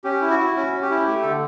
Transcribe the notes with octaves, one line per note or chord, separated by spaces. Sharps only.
C#4 G4
E4
F#4
E4
C#4 F#4
C#4
G4
E4
A3 G4
D3 A4